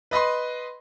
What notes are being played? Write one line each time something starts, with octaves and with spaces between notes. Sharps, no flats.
B4 D#5 B5 C6